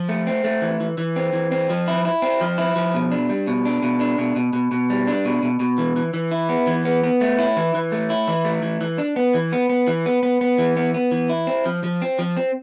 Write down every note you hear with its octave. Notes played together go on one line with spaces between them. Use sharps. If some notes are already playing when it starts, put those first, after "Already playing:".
Already playing: F3
A3
C4
A3
E3
E3
E3
C4
E3
C4
F3
E4
E4
C4
F3
E4
F3
B2
D4
G3
B2
D4
B2
D4
B2
B2
B2
B2
G3
D4
B2
B2
B2
E3
E3
E3
E4
B3
E3
B3
B3
A3
E4
E3
E3
A3
E4
E3
A3
E3
E3
D4
B3
E3
B3
B3
E3
B3
B3
B3
E3
B3
B3
E3
E4
C4
F3
F3
C4
F3
C4